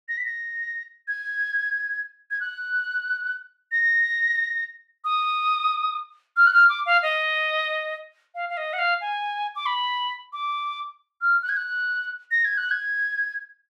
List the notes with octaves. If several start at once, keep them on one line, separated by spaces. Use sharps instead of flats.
A#6
B6
A#6
G#6
G#6
F#6
A#6
D#6
F6
F#6
F6
D6
F5
D#5
F5
F5
D#5
F#5
F5
G#5
D6
B5
D6
F6
F#6
G#6
F#6
A#6
G#6
F#6
G#6